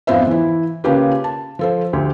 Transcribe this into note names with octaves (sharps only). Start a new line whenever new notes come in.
F2 G#2 B3 F4 C5 E5
E3 E4
C#3 A#3 C#4 F4 G4 B4
A5
F3 A4 C5
D2 G4